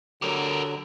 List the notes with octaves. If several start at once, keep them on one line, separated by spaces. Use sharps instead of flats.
D3 F#3 G4 A#4